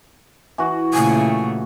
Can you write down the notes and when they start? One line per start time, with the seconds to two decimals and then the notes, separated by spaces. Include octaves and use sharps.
0.58 E3 F#4
0.94 A#2 C#3 A3 G#5